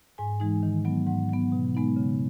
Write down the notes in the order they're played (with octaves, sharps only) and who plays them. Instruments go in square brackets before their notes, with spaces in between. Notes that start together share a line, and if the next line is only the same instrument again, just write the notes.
[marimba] G#2 G#5
E3 G#3 D#4
D#3
F#3 B3
G#2 F#5
F#3 B3
B2
G#3 B3 D#4
C#3